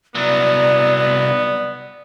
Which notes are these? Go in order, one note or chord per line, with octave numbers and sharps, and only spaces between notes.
C2 F#3 B3 D5